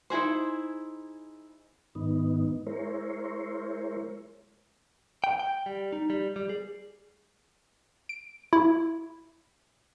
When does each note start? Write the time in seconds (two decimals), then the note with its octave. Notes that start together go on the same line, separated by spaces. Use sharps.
0.10 D#4 E4 G#4 C5
1.95 G#2 D#3 B3 D#4
2.67 G#3 E4 A#4 C5 C#5
5.24 G5
5.39 G5
5.66 G3
5.93 D#4
6.10 G3
6.36 G3
6.49 G#4
8.09 D7
8.53 E4